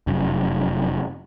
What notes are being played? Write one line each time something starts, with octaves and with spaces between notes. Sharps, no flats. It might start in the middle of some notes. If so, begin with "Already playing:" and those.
F1 F#2